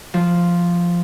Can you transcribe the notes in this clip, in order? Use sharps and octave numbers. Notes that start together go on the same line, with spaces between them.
F3